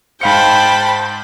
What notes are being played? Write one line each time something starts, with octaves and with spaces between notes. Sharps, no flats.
G#2 C5 F5 G5 A5 B5 C#7